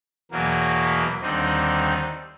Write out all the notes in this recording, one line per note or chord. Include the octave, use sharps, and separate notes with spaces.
E2 B2 F#3 A#3
D#2 D3 G3 C4 D#4